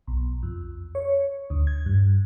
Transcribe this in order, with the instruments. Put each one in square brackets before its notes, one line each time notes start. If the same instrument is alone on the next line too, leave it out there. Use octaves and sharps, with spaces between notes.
[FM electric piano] B1
F2
C#5
D2
G#6
G2